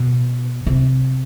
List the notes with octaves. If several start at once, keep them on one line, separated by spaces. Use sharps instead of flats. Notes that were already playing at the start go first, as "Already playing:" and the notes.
Already playing: B2
C3